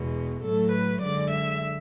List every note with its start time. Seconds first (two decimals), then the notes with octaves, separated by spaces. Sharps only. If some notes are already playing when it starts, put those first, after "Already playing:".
Already playing: E2 B2 G#3
0.43 A2 F#3 A3 A4
0.72 B4
1.02 F#2 D3 G#3 D5
1.31 E5